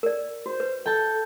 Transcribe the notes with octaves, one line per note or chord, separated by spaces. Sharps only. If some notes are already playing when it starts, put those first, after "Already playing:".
A#4 D5
F#4 C5
B4
A4 G5 A5